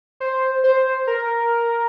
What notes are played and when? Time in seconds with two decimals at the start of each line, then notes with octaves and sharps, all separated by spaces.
0.20 C5
0.64 C5
1.07 A#4